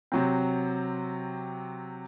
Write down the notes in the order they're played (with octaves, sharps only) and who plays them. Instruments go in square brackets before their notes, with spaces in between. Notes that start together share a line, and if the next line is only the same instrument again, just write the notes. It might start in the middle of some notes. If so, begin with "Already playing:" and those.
[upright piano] C3 F#3 C4